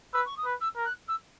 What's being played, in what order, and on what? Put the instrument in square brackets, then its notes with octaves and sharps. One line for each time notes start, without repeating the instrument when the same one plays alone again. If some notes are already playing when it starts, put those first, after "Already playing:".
[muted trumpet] B4 [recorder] E6
[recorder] C#6
D#6
[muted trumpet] B4
[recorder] E6
[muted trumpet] A#4
[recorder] F#6
E6